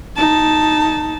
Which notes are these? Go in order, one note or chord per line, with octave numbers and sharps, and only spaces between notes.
D#4 A5